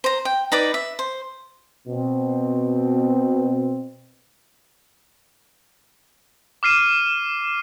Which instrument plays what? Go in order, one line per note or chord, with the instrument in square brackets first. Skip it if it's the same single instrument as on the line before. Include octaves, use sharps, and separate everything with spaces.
[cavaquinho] C5 A#5
G5
D#4 B4 D5 D6
E5
C5
[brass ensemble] B2 C4
[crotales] D6 F6 C7 D#7 E7